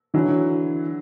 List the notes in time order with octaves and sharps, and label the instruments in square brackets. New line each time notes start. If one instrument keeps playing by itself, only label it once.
[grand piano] D3 [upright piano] E3 F#3